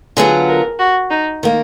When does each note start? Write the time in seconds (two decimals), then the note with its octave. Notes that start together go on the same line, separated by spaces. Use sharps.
0.17 D3 F#3 B3 F4 G#4
0.48 A#4
0.79 F#4
1.10 D#4
1.43 D#3 A#3